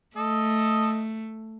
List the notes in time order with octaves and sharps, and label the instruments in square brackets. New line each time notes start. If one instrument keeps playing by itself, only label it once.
[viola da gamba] A3 [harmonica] A4 D#5